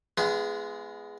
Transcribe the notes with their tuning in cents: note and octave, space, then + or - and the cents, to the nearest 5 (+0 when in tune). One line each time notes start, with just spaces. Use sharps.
G#3 +0 B3 +10 F4 -35